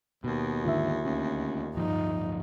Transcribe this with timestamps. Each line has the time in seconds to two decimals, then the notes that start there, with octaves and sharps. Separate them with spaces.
0.24 D#2 B2
0.65 G#2 D3 D#3 F4 E5
1.05 D2 C#4
1.75 D1 G2 F3 D#4